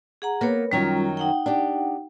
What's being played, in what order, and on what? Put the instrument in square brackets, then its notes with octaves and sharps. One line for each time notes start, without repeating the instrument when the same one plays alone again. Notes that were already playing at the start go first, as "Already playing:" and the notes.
[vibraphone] G#4 F#5 A#5
[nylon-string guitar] A#3 B3 [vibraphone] A#4 C#5
[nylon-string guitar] F#2 D#3 F#3 [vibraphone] G3 C#4 F4
[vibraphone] D#4 F#5 G5
[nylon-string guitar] D4 G4